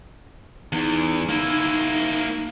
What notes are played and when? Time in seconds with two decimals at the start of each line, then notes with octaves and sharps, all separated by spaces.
0.73 E2 D#4
1.29 A#3 E4